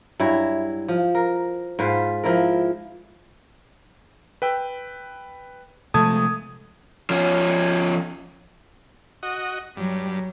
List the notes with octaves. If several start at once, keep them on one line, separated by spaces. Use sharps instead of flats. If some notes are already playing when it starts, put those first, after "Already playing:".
G2 F#3 E4
F3
A#4
G#2 F4 B4 C5
F3 E4 A#4
B4 G5 E6
C3 F3 G#3 A3 A5 D#6 G#6
F3 C#4
F#4 D#5
G2 F#3